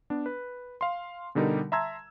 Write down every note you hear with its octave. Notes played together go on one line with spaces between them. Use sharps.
B3 D4
B4
F5 C6
B2 D3 G3 D#4 G4 A#4
E5 A5 A#5 C6 E6 G#6